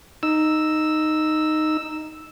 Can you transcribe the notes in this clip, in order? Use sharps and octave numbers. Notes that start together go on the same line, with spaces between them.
D#4 E6